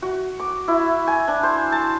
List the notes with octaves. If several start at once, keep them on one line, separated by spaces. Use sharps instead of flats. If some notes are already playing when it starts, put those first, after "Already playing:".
F#4
D6
E4
G#5
D4
C5
A5